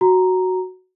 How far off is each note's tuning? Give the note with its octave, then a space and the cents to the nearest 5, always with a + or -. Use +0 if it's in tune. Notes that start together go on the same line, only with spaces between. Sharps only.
F#4 +0 A#5 +0